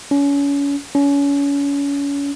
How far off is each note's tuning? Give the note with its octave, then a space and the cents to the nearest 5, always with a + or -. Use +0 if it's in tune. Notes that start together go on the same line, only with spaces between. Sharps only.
C#4 +30
C#4 +30